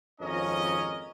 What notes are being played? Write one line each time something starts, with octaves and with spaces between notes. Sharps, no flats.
G#1 F2 C#4 A#4 D#5